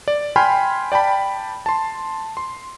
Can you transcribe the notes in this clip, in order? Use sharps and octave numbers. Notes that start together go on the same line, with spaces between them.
D5
G5 G#5 B5 C6 F6
D5 G5 A5 B5
A5 C6
C6